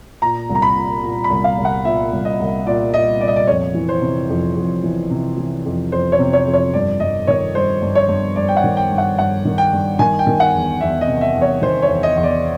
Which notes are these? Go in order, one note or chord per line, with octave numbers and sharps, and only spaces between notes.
A#2 A#5
C2
A#5
B5
A#2
A#2
B5
C2
F5
C2
F#5
A#2 E5
C2
D#5
C2
A#2 D5
A#2 D#5
A#2 D5
D#5
D5
F2 C#5
E3
C5
C3
F2
F2
E3
C3
E3
F2
F2 C5
C#5
C3
C#5
F2
C#5
G2 D5
G2 D#5
D#3 C#5
G2 C5
G2
C#5
G2
G2 D5
G5
F#5
D#3
G5
G2
F#5
G2 F#5
D#3
G5
G2
D#3 G#5
G5
D#3
F#5
E2
E2 E5
D#5
C3
E5
E2
C#5
D#3 C5
C#5
E2
D#5
E2
D5